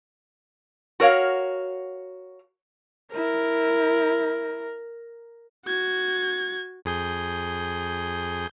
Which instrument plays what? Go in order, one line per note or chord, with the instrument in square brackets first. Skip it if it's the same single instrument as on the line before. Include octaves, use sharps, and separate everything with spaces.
[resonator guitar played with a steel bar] F#4 A#4 C#5 F5
[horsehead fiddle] E4 [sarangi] A#4
[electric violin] F#4 G#6
[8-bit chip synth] F2 G#4 G6